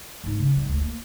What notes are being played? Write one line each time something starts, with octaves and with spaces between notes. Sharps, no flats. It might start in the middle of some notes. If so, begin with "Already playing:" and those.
G#2 D#4
C#3
G#2 G3
D2
A#3